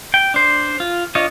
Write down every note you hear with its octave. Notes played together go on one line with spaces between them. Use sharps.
G5
D4 C5
F4
D4 F4 C#5 D#5